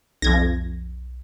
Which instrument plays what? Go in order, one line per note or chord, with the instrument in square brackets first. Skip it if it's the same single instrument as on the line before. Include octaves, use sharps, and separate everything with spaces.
[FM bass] B1 [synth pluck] F2 G#6 A#6